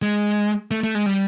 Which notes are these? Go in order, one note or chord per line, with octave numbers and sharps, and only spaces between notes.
G#3
A3
A3
G#3
G3